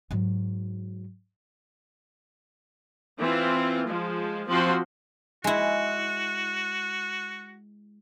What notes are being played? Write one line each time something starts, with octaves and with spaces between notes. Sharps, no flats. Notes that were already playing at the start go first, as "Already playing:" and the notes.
G#2 F#3
E3 C4 F4
F3 G#3
F3 C4 F#4 C6
G#3 E4 F#4